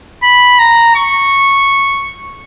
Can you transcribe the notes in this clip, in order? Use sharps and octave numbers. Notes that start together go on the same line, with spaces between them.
B5
A#5
C#6